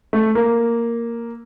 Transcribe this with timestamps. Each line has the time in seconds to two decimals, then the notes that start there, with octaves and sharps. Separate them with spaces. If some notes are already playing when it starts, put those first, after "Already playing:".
0.13 A3
0.35 A#3